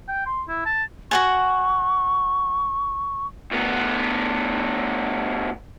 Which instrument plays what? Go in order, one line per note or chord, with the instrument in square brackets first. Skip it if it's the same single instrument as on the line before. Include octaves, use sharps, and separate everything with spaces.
[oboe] G5
C6
E4
A5
[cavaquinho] F#4 F#5 G#5 [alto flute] C#6
[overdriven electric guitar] D2 B3